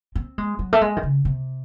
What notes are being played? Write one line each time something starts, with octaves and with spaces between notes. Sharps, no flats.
C4
G#3
F#3
A3
G#3
D#3
C#3
C3